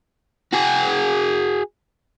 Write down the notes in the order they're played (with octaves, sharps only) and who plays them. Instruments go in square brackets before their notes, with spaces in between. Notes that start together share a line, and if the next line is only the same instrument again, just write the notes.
[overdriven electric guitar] F#4 G#4